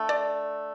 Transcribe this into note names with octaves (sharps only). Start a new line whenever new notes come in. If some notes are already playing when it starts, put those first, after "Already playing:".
Already playing: D3 A3
D5